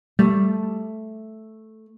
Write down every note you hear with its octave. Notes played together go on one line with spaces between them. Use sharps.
G3 A3